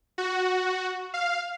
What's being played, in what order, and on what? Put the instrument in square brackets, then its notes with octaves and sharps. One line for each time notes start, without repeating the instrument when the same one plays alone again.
[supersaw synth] F#4
F5